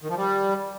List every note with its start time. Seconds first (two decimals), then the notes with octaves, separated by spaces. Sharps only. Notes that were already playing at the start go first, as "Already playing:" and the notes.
0.02 D#3
0.09 F3
0.16 G3